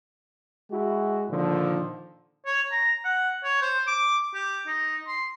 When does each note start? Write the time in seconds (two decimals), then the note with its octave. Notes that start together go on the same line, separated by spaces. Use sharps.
0.71 G#3 E4 F#4
1.30 A#2 D3 D#3 F3
2.46 C#5
2.72 A#5
3.05 F#5
3.44 C#5
3.62 C5
3.87 D6
4.34 G4
4.67 D#4
5.08 C6